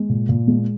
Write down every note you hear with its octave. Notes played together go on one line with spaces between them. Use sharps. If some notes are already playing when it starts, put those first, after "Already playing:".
Already playing: G#3
A#2
A#2
G#3